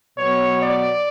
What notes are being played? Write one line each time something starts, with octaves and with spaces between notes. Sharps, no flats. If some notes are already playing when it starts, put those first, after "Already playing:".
B2 F#3 B3 C#5
D5